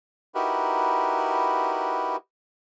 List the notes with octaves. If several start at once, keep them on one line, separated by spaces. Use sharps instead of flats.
D#4 E4 F#4 G4 A#4 B4